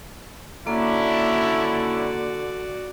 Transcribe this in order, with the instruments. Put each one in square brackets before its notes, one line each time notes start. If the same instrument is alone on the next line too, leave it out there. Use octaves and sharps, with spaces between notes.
[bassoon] D3 [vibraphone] A#3 [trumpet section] C#4 D4 E4 [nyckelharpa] F#4 D5